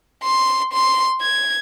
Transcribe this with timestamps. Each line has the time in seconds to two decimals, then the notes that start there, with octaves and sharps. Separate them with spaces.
0.24 C6
0.73 C6
1.22 G#6